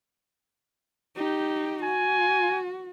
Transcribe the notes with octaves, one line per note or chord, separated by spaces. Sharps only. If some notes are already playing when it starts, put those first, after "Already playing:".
D#4 G4
F#4 G#5